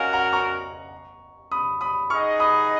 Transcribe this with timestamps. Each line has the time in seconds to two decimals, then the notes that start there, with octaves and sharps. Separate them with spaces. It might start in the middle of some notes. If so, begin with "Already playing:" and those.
Already playing: C#4 F#4 A#4 D#5 F5 F#5 G#5
0.13 F#5 A#5
0.33 A#5 C#6
1.52 B5 D#6
1.81 B5 D#6
2.10 D#4 G#4 D#5 F#5 C#6 F6
2.40 B5 D#6